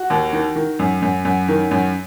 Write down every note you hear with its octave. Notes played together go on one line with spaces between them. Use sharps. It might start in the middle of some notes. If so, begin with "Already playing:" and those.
Already playing: F#4
D#2
D#3
D#3
F#2
F#2
F#2
D#3
F#2